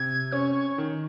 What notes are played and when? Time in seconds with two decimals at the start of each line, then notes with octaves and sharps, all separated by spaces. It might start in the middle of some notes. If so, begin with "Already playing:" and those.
Already playing: C3 G#6
0.32 C#4 C#6
0.78 D#3